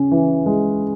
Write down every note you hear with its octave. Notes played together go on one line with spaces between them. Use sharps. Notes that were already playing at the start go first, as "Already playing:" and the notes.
Already playing: C#3 C#4
E3
G#3